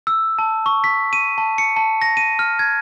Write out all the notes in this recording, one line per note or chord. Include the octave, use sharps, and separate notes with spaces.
E6
A5
C#6
B6
D#7
A5
C#7
A5
A#6
D#7
F6
G#6